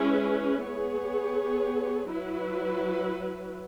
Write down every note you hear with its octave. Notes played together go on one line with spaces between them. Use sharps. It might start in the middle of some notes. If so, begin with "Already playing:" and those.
Already playing: G#3 C#4 E4 G#4 B4
B3 G#4 C#5
F#3 E4 B4